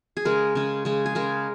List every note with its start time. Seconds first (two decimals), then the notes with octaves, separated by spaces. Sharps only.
0.17 G#4
0.25 C#3 G#3 A#4
0.55 C#3 G#3
0.85 C#3 G#3
1.06 G#4
1.15 C#3 G#3 A#4